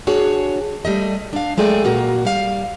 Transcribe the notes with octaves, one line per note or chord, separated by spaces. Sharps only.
D4 F#4 G#4 C#5
G3 A3 D#5
D4 F5
F#3 G#3 A3 G#4 D5 G5
A#2 A#3 F#4
G3 F5